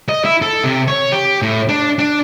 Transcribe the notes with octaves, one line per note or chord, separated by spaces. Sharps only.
D#5
E4
A4
C3
C#5
G4
A2
D4
D4